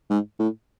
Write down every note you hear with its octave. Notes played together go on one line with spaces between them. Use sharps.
G#2
A2